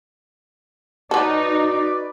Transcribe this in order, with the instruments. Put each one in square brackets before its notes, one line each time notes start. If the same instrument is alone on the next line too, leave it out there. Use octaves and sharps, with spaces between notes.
[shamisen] F#3 A4 [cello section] D#4 [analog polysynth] F#4 B4 [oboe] D5